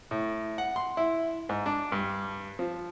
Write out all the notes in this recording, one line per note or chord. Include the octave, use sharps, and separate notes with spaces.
A2
F#5
C6
E4
G#2
D4
G2
F3